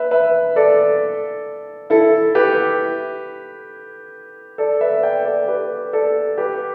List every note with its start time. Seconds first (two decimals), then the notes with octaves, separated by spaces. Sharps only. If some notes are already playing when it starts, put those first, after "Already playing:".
Already playing: B4 E5
0.11 B4 E5
0.56 A4 D5
1.90 E4 A4
2.35 G4 B4
4.58 A4 D5
4.81 B4 E5
5.03 D5 G5
5.25 A4 D5
5.48 G4 B4
5.93 A4 D5
6.38 G4 B4